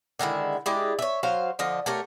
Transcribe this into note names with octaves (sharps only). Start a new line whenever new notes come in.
D3 D#3 G#3 E4
G#3 D4 E4 G4
C#5 E5
F#3 C5 F5
D3 F3 D#5
A3 G4 A#4 C#5